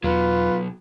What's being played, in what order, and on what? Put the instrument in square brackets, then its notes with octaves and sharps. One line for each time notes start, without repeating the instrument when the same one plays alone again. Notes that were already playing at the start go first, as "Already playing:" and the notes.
[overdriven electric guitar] B1 F#3 [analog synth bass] E2 [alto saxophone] F4 [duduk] B4